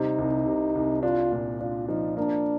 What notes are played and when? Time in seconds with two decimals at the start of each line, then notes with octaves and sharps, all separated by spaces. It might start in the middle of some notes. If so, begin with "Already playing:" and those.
Already playing: C3 G3 D#4
0.18 C2
0.46 C3
0.75 C2
1.03 D4 F4
1.32 A#2
1.60 D4 F4
1.89 F3 D#4
2.17 A#3 D4